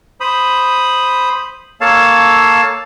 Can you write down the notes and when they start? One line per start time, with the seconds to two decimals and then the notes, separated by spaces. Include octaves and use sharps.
0.20 C5 B5 D#6
1.81 A#3 A4 C#5 F5 A5